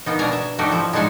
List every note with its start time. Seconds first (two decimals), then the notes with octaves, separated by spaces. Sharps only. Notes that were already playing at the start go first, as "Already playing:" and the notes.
0.06 A#3 B3 D#4
0.19 B2 D4 D5 G#5 A#5
0.33 E5
0.58 A3 D4 D#4 F#4 G4
0.71 F3 E4
0.93 G#3 D4 D#4 F#5 G#5